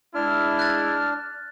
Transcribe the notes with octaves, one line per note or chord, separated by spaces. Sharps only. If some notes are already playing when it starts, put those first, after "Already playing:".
G#3 D4 E4 F6
F#6 A6